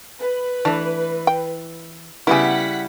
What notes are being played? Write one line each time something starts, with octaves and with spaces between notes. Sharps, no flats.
B4
E3 A3 D4
G5
C#3 G3 B3 E4 G#4 F#5 B6